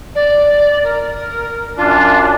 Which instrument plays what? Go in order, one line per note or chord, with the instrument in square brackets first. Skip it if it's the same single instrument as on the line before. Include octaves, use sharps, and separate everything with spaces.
[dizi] D5
A#4
[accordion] F#2 D4 [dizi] F4